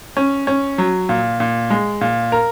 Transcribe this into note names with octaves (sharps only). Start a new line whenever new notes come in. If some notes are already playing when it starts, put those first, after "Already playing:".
C#4
C#4
F#3
A#2
A#2
G#3
A#2
A#4